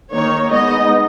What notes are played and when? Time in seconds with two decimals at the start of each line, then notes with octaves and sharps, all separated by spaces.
0.12 D#3 A#3 D#4 C#5
0.51 G#3 B3 D#4 D#5